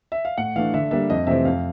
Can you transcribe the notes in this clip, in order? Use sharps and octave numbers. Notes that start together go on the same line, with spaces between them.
E5
F5
A2 F#5
E3 A3 D4 F5
D3 E5
G3 A#3 D4 E5
F2 D#5
C3 E3 A3 C4 E5
F2 F5